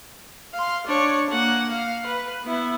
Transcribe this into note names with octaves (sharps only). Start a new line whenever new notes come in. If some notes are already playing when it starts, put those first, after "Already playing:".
F5 C6
D4 C#5
A#3 F#5
F5
B4
B3 E4